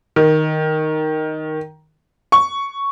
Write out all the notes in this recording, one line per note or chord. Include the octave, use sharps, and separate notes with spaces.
D#3
C#6